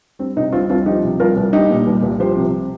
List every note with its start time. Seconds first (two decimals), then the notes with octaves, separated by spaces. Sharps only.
0.19 G3 C4
0.36 C3 D#4
0.52 C2 C4 F4
0.69 C2 C4 F4
0.86 F3 D#4 G4
1.03 C3
1.20 C2 F4 A#4
1.37 C2
1.53 G3 D#4 G4
1.70 A#2
1.87 C2
2.03 C2
2.20 F3 G4 C5
2.36 C3